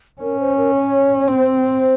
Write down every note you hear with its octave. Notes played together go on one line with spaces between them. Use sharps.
C#4 A#4
C5
A#4
C#5
C#5
C4 C5
C5